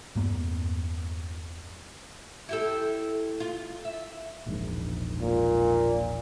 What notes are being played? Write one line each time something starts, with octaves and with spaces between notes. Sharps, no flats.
E2 G2 A#3 B3
E4 G4 A4
F4
E5
E1 A#1 G#2
A#2